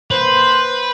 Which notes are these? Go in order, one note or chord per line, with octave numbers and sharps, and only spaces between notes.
A#3 B4 C5